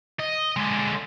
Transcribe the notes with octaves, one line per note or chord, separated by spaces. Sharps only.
D#5
D3 G#3